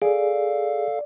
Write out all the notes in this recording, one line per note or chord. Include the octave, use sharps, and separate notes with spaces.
G#4 A4 D5 F5